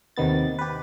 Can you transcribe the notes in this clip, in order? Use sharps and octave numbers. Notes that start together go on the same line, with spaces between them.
D#2 C3 D#3 B3 A6
G4 B4